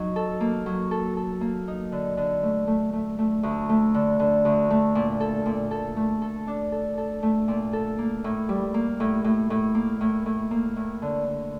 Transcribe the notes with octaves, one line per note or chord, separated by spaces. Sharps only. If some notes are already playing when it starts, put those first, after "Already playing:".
Already playing: F#3 D#4
A4
A#3
F#3
A4
A4
A#3
D#4
D3
D3
A3
A3
A3
A3
D2
A3
D3
D3
D2
A3
A#2
A4
A#2
A4
A3
A4
D4
A4
A4
A3
A#2
A4
A#3
A2
G3
A#3
A2
A2
A2
A#3
A2
A2
A#3
A2
D3
D3